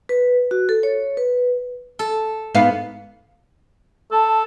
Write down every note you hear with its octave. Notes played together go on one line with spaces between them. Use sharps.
B4
F#4
A4
C#5
B4
A4
G#2 B3 F5
A4 A5